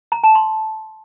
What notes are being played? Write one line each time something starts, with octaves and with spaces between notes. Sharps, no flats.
A#5
A5
C6